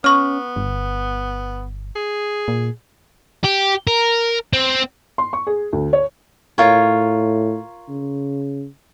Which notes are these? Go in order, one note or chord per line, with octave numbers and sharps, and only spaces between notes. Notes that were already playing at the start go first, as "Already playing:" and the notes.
B3 C#4 C#6 F6
G1
G#4
A#2
G4
A#4
C4
C6
C#6
G#4
D2
C#5
A2 F4 A#4 C#5
C#3